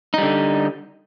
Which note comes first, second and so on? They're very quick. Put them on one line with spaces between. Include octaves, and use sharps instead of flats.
D#4 G3 D3